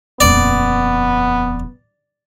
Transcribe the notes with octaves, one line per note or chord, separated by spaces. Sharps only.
D#1 F2 B3 D5